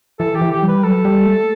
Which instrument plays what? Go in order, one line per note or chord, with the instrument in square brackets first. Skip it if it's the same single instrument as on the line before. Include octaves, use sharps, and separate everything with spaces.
[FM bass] E3 [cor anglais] A4
[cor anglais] G4
[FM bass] E3
[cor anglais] G4
[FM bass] G3
[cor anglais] B4
[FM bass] F#3 [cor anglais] A4
[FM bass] G3
A3